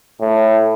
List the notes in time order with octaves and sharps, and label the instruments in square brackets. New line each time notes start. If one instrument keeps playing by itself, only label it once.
[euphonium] A2